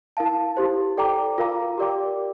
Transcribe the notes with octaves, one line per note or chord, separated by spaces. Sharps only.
E4 A#4 F5 A5
E4 G4 C5
A4 D5 G5 A#5 D6
F4 A#4 F5 A#5 D6
G4 A#4 D5 G5 D6